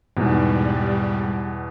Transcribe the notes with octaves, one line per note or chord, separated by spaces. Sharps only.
E2 G#2 B2 G3